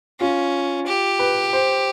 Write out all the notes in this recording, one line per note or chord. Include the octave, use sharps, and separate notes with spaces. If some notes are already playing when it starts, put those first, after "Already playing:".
C#4 F4
G4
B4
C5